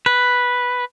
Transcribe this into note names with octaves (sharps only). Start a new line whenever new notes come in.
B4